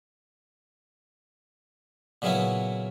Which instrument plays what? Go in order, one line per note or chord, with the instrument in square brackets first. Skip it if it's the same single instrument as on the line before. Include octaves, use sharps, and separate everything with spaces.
[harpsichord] A#2 C#3 F#3 B3 C#4 E4